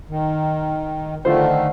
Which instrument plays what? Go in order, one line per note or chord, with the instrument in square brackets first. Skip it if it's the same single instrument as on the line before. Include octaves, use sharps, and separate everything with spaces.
[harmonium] D#3
[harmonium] D3 D#3 A3 [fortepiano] F4 C5